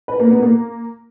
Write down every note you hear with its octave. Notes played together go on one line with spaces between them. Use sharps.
B4
A#3
B3
A#3